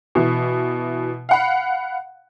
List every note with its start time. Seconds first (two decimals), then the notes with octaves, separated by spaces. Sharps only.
0.15 B2 E3
1.29 F5 F#5 B5